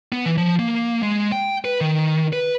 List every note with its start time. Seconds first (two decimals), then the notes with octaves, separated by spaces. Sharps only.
0.12 B3
0.26 E3
0.37 F3
0.59 A#3
1.03 G#3
1.32 G5
1.65 B4
1.81 D#3
2.33 B4